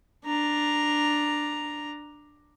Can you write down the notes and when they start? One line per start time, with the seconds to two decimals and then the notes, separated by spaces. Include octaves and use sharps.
0.25 D4 A#5